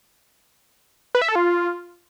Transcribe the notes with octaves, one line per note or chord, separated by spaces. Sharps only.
B4
E5
A4
F4